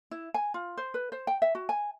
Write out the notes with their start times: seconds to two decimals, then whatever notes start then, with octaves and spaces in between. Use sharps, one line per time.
0.11 E4
0.34 G#5
0.54 F4
0.77 C5
0.94 B4
1.12 C5
1.27 G5
1.42 E5
1.55 F#4
1.69 G#5